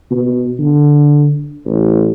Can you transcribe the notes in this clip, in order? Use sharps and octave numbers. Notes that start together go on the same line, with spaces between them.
B2
D3
A1